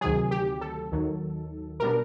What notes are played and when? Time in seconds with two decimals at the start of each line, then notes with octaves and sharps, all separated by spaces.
0.01 D2 C3 D#3 F#3 G#4
0.31 G4
0.61 A4
0.91 D#2 D#3 F#3
1.80 B2 G3 B3 D4 A#4